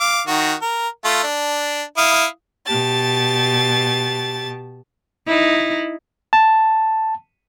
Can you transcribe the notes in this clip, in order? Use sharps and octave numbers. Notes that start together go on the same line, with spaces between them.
F5 D6
D#3 F#4
A#4
A3 F4
D4
E4 F5 D#6
B2 G4 A5 A6
D#4 E4
A5